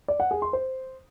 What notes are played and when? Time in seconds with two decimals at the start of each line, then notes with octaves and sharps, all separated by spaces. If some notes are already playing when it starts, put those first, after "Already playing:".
0.08 D5
0.20 F#5
0.31 G#4
0.42 C6
0.53 C5